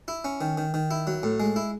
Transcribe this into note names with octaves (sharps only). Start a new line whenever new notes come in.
E4
C#4
D#3
D#3
D#3
E4
F#3
A2
G#3
E4